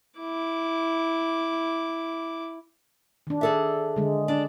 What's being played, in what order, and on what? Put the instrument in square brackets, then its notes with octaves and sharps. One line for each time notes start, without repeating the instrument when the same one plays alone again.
[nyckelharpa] E4 D6
[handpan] D#3 D4
[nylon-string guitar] G#4 A4 E5
[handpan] D3 G#3
[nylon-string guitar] D4